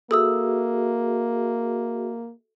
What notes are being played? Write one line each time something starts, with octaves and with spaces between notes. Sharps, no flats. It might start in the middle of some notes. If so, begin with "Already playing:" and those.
A#3 F#4 G#4 A4 E5 D#6 E6